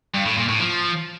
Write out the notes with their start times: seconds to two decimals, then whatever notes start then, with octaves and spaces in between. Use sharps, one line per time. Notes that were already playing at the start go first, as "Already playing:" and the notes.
0.14 G2
0.26 A2
0.37 A#2
0.48 A2
0.60 F3